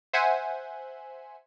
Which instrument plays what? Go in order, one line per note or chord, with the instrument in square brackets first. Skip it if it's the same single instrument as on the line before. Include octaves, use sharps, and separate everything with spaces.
[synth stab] C5 E5 F#5 G#5